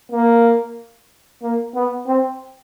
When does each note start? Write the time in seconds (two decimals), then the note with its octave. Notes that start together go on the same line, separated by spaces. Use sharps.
0.12 A#3
1.43 A#3
1.75 B3
2.07 C4